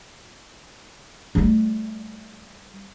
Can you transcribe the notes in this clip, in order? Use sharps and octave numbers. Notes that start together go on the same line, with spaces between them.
G3 A3